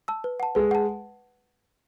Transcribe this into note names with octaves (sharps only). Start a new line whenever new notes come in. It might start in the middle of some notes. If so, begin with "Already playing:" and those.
A5 E6
B4
F#5 A5
G#3 B4
F#5 A5